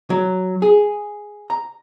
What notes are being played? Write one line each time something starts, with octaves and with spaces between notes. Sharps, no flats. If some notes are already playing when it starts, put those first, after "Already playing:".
F#3
G#4
A#5